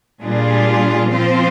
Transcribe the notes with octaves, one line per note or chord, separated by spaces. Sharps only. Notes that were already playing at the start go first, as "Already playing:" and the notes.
A#2 G3 D4 F4 G#4
F3 C4 F4 C5